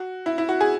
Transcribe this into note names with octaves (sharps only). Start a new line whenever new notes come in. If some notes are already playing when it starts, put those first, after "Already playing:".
Already playing: F#4
E4
E4
F#4
G#4